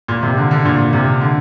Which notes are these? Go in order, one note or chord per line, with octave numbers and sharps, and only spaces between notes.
A#2
C3
D3
D3
A#2
C3
D3